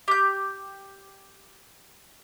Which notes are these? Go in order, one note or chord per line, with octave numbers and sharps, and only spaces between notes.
G4 G6